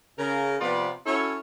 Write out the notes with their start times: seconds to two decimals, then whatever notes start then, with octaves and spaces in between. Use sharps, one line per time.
0.19 C#3 A#4
0.61 C3 F3 B3 F4 B4 D5
1.06 C#4 E4 F#4 A4 C#5